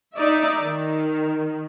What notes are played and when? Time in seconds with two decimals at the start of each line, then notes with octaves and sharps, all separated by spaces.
0.16 D#4 D5 E5
0.62 D#3